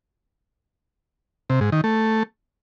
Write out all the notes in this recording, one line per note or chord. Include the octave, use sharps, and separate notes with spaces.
C3
G#2
D#3
A3